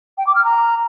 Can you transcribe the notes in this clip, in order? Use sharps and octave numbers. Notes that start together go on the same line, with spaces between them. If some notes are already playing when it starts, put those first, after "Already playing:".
G5
D6
F6
A#5